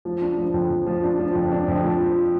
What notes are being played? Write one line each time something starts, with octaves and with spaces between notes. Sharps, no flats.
F3
D4
F3
F2
F2
F3
D4
F3
F2
D4
F2
F3
F3